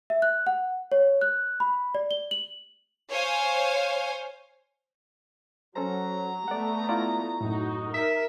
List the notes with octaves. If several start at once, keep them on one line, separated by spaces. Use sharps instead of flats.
E5
F#6
F#5
C#5
F#6
B5
D5
G7
F#7
C5 C#5 F5 G#5
F#3 C#4 A4 C5 A#5
A3 B3 D5 F#5
E4 F4 D5
F#2 A2 D#4 F#4
A#4 E5